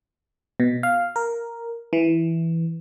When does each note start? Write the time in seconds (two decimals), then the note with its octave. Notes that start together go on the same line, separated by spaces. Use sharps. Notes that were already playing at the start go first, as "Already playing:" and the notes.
0.60 B2
0.83 F5
1.16 A#4
1.93 E3